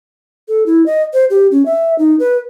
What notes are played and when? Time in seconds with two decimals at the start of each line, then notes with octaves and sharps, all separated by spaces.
0.48 A4
0.66 E4
0.86 D#5
1.13 C5
1.30 G4
1.51 C#4
1.66 E5
1.99 D#4
2.20 B4